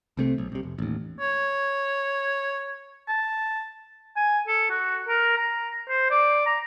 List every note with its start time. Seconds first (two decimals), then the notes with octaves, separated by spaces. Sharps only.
0.17 C2 C3 A3 C4
0.38 B1
0.52 C2 C3
0.63 F1
0.79 A1 D#2
1.20 C#5
3.08 A5
4.16 G#5
4.47 A4
4.70 F#4
5.08 A#4
5.37 A#5
5.89 C5
6.11 D5
6.46 A#5